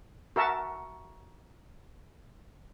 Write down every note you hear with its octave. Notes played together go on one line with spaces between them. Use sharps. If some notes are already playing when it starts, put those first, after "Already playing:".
F#4 A#4 E5 A5